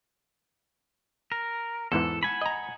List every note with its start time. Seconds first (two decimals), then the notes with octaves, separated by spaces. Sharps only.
1.32 A#4
1.92 E2 G#2 E3 A4
2.23 F#5 G#5 B5
2.41 D#5 A#5